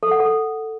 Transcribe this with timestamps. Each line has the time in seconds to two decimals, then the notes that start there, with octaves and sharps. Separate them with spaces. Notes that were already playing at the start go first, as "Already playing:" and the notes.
0.03 A4
0.11 F#5
0.20 A4